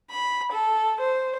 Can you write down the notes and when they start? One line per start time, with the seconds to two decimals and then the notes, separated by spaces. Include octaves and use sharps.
0.10 B5
0.52 A4
0.99 C5